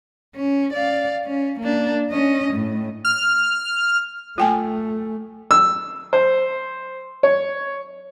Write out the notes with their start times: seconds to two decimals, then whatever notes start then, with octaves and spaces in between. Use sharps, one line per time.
0.36 C#4
0.73 D5 F5
1.25 C#4
1.60 A#3 D4
2.11 C#4 D#5
2.53 A2
3.05 F6
4.38 A3 F4 G5 G#5
5.51 E6
6.13 C5
7.23 C#5